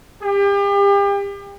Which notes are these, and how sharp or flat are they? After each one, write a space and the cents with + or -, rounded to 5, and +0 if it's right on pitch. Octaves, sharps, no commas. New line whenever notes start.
G4 +35